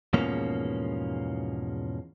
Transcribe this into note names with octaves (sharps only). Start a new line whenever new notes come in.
E2 G#2 B2 F3 A#3 C#4